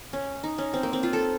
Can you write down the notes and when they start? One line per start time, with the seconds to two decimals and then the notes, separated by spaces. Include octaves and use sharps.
0.13 C#4
0.43 D#4
0.58 C#4
0.73 C4
0.83 A#3
0.93 C4
1.03 F4
1.13 A4